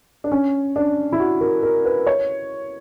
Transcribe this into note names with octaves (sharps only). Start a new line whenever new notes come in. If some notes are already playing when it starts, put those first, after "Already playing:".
D4
C#4
D4
E4
F#4
A#4
A#4
B4
C#5